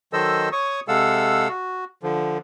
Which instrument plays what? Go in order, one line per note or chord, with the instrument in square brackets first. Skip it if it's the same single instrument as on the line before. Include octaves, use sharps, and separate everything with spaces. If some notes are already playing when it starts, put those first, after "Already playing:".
[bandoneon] D#3 F#3 A4 C5 D#5 E6
C#5 C#6 D#6
C3 G#3 A4 F5 F#5 E6
F#4
D3 F3